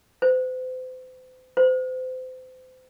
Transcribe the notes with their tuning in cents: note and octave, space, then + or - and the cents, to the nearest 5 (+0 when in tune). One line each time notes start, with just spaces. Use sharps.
C5 -40
C5 -35